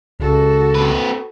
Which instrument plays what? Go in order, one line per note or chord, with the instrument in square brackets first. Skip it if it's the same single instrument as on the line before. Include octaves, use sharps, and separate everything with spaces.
[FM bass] C#2 [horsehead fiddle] F#4 A4
[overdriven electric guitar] C4 B4